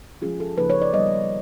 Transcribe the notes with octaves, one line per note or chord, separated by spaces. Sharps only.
F3 G#3 C#4 F4 G#4
A4
C#3 F3 A#3 D#4 B4
C#5
D5
D#3 G3 B3 D#5